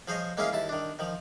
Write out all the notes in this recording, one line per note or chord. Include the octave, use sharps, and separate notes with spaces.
F3 G#4 C5 C#5 D#5
G#3 A#3 C#4 E4 G#4 F5
D#2 E4 A5
D#3 D4
D#3 F3